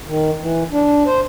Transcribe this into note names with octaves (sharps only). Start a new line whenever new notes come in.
D#3
E3
D4
C5